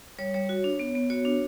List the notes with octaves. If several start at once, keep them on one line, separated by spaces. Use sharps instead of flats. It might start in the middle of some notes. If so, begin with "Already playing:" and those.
G3 C#5
G3 C#5
F#4
D4
B3
B3
F#4 C#5
D4